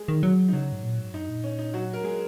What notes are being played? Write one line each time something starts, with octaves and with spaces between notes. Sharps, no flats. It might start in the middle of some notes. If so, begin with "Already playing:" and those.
Already playing: G#3 G#4
D#3
F#3
D#4
C#3 F#3 F#4
G#2
A#2
G#2
F#2 D#4
A#2
C#4
D#4
F#3 F#4
A#4
G#3 G#4